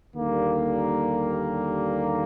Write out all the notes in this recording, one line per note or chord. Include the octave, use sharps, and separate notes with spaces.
D#2 D3 G3 A#3